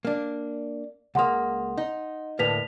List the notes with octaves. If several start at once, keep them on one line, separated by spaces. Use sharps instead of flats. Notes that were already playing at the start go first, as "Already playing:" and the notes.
A#3 D4
C#2 A#3 F#5 C6 D#6
D#4
D2 A2 A#3 B4 B6 F7